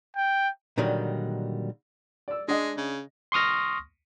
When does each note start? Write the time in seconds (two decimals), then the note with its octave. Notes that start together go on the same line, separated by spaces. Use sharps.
0.17 G5
0.78 A#2 D3 D#3 F#3 G3
2.28 D5 E6
2.48 G#3 D4 D#5
2.77 C#3
3.32 C6 C#6 D#6 F6 A#6